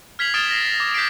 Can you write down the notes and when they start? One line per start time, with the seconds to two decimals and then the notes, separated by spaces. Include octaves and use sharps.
0.19 F6 G#6 B6 C7 F7 F#7
0.34 D#6 F6 A6 D7 E7 G7
0.51 A#6 C7
0.65 B6
0.80 D6
0.94 G6 B6 C7 D7